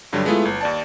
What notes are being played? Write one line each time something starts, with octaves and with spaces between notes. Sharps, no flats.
G2 D3 F#3 G3
G#3 A3 B3 E4 F4
G1
D#2 D5 A5